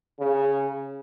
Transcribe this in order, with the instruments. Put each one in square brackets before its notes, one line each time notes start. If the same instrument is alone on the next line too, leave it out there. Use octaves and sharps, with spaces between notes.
[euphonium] C#3